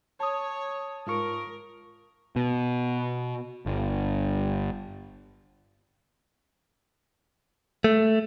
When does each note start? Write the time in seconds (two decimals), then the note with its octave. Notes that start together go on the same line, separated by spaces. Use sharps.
0.20 C#5 A5 D#6
1.07 G#2 F4 A#4 C#6
2.36 B2
3.66 G1
7.84 A3